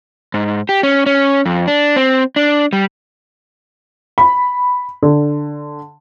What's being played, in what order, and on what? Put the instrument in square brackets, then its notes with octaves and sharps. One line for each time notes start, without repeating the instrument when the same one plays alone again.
[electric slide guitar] G#2
G4
C#4
C#4
F2
D4
C4
D4
G3
[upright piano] B5
D3